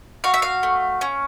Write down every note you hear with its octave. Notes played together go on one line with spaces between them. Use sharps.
F#4 F5
E5
F5
A3
C#4